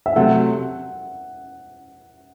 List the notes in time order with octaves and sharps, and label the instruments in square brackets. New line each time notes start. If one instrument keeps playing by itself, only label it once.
[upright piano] E5
[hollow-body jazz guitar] C3 F#3 A3 [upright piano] F#5